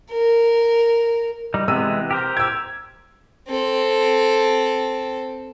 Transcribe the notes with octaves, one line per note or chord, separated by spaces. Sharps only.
A#4
G3 D#4
C3 E3 G#3 B3 E6 D#7
G4 A#4 C5
E6 G#6
C4 A4